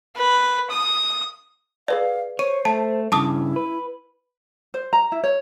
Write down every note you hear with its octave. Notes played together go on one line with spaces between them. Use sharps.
B4
D#6
G#4 B4 D5 F5
C5 C#5 D#7
A3 A5
G2 C#3 E4 A5 D6 D#6
B4
C5
A#5
E4
C#5